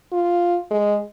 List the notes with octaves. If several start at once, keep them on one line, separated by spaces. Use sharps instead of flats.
F4
G#3